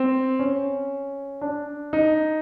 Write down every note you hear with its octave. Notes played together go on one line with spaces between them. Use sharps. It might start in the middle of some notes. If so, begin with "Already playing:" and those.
Already playing: C4
C#4
D4
D#4